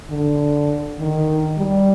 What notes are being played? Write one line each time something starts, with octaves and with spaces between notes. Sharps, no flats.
D3
D#3
G3